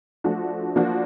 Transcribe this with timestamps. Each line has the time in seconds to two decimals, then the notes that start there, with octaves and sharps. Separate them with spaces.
0.24 F3 A3 D4 F#4
0.76 F3 A#3 D4 F#4